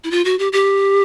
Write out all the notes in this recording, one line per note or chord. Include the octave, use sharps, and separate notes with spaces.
E4
F4
F#4
G4
G4